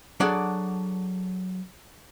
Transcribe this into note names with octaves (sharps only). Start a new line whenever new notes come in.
F#3 D4 G#4 A4 D5 F#5